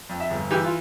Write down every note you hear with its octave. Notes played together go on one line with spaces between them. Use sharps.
F2
E5
G1
E3 G4
F4